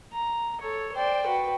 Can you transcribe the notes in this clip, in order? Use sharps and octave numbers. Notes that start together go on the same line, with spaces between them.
A#5
A4 C#5
C5 D5 G5
F#4 B4